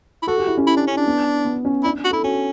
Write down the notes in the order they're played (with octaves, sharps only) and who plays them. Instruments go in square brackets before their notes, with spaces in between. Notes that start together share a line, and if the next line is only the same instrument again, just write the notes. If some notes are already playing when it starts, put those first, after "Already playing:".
[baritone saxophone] E4
[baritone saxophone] F#4 [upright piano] A4
[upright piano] G4
E4
C#4
[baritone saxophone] E4
D4
C#4
D4
[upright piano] B3
B3
C#4
[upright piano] D4 [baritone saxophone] E4
[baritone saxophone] F#4
[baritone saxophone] E4 [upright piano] A4
[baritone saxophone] C#4 [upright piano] F#4